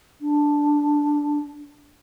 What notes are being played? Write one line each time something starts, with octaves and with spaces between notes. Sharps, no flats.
D4